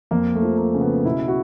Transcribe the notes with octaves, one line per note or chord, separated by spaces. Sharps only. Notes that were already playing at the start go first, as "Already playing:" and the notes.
F2 A#3
A3
F3
A#3
C#3
B3
B2 E4
F#4